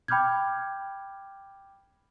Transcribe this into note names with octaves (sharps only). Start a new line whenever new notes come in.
G5 B5 D6 F6 G6 G#6